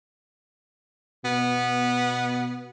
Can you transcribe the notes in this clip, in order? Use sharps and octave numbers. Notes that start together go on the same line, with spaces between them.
B2 B3